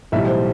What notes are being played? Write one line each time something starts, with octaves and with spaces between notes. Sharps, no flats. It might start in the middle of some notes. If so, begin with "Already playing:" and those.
B1 A2 E3 G3 E5
C5